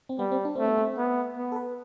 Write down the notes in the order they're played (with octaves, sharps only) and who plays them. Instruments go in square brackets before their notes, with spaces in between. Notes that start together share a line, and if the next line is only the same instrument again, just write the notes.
[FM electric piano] C4
[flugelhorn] G3 [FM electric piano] B3
[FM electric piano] C4
D4
[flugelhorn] A3 [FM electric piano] C4
[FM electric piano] B3
C4
[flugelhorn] B3
B3
[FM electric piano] A4
B4